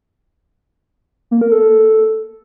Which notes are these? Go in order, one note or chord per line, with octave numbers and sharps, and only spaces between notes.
A#3
A#4
A4